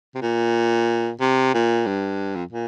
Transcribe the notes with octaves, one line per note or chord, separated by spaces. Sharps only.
C3
A#2
C3
A#2
G2
F2
A#2